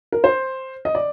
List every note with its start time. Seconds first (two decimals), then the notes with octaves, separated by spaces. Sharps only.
0.12 A#4
0.24 C5
0.85 D#5
0.95 D5